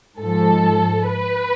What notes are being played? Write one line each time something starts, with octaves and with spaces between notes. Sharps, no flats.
G#2 F3 A4
B4